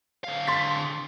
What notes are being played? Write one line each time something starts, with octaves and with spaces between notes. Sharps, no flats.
D3 F5
C6 A6 B6